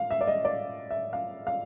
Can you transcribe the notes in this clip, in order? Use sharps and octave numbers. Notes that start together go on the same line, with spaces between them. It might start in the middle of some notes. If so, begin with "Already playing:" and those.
Already playing: F5
E5
D5
D#5
D5
E5
F5
F5